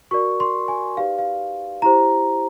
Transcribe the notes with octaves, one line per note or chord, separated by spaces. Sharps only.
F#4 A#4 D5 C#6
C6
G#5
D#4 G4 B4 D5 F5
F5
E4 G4 C5 A#5